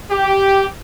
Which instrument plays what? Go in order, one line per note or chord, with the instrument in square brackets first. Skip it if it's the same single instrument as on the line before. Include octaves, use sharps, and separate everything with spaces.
[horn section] G4